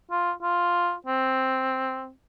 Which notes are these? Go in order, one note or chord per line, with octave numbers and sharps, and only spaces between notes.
F4
F4
C4